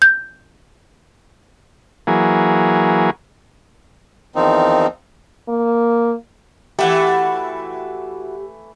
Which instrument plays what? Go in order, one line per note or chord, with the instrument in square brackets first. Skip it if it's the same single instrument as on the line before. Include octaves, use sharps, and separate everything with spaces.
[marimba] G6
[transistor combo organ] E3 F#3 A#3 G#4
[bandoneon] E2 D#3 F3 C4 D#4
[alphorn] A#3
[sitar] E3 A3 [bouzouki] E4 F#4 [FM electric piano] G4